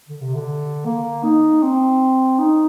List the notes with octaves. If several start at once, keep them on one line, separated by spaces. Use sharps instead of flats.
D3
C3
D3
A#3
D#4
C4
D#4